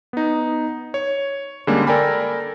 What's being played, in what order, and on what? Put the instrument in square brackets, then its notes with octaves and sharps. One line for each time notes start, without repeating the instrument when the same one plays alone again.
[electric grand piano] B3 D#4
C#5
D3 G3 G#3 A#3 C#4
A4 A#4 D5 G5 G#5 B5